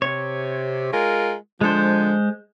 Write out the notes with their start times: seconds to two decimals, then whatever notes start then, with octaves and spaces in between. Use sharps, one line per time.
0.02 C3 C#5
0.93 G#3 F4 A#4
1.61 D3 F3 G#3 C5